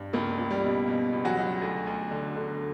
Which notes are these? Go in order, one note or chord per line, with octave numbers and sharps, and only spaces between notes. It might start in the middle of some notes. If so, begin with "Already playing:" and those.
Already playing: G2
C#2 A#3
C#2
G3
B2
B2
C#2
F#3 F#4
C#2
D2
D2
D3
D3